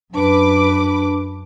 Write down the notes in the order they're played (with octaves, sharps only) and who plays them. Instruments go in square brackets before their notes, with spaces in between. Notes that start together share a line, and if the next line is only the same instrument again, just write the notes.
[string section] F#2 B4 D6 [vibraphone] D4 A5